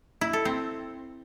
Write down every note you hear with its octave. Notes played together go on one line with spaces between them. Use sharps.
E4
A4
C4